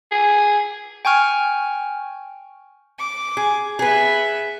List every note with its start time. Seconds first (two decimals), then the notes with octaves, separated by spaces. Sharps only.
0.11 G#4
1.05 G5 G#5 C#6 F6
2.99 D6
3.37 G#4
3.79 B3 G#4 B4 E5